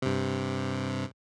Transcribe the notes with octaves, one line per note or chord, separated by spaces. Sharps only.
G2 C3